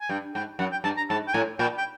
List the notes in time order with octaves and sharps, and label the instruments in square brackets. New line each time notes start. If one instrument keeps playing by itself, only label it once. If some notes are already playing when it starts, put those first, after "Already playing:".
[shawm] G#5
[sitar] G2 [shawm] G5
[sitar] G#2 [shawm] G5
[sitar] F#2 [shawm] F#5
[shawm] G5
[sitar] G2 [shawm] A5
[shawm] A#5
[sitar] G#2 [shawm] A5
[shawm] G5
[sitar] A2 [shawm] G#5
[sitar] A#2 [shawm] G5
[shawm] G5